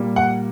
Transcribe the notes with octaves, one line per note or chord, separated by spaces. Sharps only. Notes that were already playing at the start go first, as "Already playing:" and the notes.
Already playing: A#2 G3 A#3
F#5